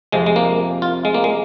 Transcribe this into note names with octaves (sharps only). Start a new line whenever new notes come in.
F2 C3 F3 G#3
G#3
A#3
F4
G#3
A#3
G#3